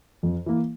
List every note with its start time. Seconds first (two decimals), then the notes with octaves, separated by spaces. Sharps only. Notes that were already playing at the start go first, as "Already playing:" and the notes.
0.23 F2
0.46 E3 A#3